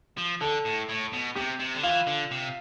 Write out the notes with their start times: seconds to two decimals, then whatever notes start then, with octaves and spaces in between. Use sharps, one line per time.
0.18 F3
0.41 D3 A4
0.65 A2
0.89 A2
1.13 B2
1.35 C3 G4
1.59 C3
1.75 D3
1.83 E3 F4
2.07 D3
2.31 C3